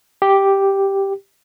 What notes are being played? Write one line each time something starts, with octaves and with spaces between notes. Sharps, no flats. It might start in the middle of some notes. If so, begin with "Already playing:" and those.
G4